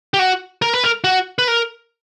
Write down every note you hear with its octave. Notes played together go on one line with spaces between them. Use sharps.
G4
F#4
A#4
B4
A#4
F#4
B4
A#4